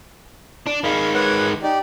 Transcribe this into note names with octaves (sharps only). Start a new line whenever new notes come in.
D4
D#3 G#3 F5 B5
B4 C#5 F#5
D#4 G4 D5